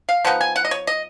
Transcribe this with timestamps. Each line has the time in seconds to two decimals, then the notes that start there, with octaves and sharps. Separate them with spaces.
0.09 F5
0.25 F3 B3 D#4 F#5
0.41 G#5
0.56 F#5
0.65 D#5
0.71 C#5
0.87 D#5